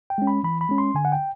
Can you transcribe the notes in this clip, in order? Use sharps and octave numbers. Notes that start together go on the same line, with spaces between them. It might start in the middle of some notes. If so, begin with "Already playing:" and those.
G5
G#3 C#4
B5
E3 B5
B5
G#3 C#4
C6
D3 G#5
F#5
G5